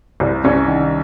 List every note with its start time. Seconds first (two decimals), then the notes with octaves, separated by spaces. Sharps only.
0.20 C2
0.44 C2 C#4
0.68 D#3